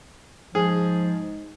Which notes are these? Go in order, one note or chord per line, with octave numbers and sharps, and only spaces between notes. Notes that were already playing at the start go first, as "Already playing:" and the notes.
G#2 F3 G#4